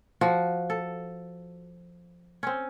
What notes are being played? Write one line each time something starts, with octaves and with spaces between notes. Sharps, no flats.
F3 F#4
A4
C4 C#4